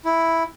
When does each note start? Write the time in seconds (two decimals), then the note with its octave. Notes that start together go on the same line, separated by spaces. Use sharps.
0.05 E4